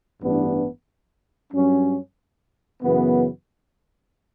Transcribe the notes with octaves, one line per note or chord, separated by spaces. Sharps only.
A1 G2 E3 B3 D4
G2 F#3 C#4
F#2 C#3 E3 B3